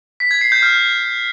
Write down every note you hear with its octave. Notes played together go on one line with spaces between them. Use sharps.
B6
G#6
C7
G6
F6